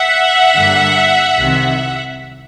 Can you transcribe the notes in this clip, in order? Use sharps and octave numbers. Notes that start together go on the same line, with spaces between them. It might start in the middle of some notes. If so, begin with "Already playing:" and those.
Already playing: E5 F#5
G2 D3 G3 A#3
C2 C3 D#3